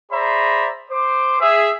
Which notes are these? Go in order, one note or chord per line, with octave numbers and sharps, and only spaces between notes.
G#4 C5 D5 E5 A#5 B5
C5 D6
G#4 E5